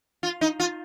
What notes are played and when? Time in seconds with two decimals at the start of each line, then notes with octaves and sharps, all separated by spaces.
0.23 F4
0.41 D#4
0.60 F4